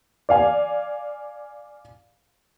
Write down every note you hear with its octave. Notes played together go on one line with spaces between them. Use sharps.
D5 F5 G#5